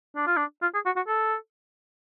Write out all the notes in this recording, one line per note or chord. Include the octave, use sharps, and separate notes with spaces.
D4
F4
D4
F4
G#4
F#4
F#4
A4